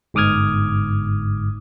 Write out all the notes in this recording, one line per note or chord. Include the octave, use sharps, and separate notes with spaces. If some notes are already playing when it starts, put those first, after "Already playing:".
G1 G#2 D6 D#6 F6 G#6